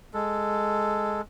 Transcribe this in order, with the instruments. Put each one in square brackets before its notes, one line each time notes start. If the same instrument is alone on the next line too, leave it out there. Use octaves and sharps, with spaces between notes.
[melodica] G#3 A4